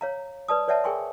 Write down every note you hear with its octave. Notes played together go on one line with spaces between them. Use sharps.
C#5 F5 A#5
B4 D5 A5 D#6
B4 C#5 D5 E5 F#5 A5
G#4 A#4 G5 G#5 C6 C#6